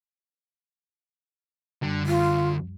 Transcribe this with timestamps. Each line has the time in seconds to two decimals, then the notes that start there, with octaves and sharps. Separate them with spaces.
1.82 F#2 D3 G3
2.07 D2 F4